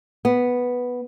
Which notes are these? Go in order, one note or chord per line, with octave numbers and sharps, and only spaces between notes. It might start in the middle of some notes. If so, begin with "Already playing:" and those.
B3